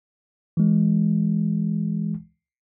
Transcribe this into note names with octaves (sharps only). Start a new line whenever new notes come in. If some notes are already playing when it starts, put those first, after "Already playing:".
E3 G#3